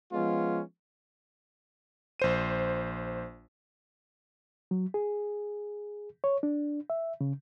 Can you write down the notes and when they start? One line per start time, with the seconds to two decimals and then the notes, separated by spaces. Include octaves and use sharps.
0.13 F3 G#3 B3 C#4 F4
2.20 A#1 C5 D#7
4.71 F#3
4.94 G#4
6.24 C#5
6.43 D4
6.90 E5
7.21 C#3